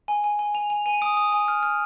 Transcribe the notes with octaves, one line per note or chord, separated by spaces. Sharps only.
G#5
G#5
G#5
G#5 F7
G#5 F7
G#5 D#7
D#6 D7
D#6
G#5
F6
F6